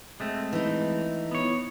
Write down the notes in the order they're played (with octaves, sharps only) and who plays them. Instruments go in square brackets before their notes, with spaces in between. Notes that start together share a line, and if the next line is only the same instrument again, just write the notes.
[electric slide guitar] G#3 A3 C4
[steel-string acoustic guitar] E3 D#4
[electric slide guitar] B3 C#5